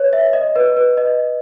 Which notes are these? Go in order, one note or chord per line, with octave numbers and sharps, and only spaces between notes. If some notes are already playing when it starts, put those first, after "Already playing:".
Already playing: B4 C#5
E5
D#5
B4
B4
D#5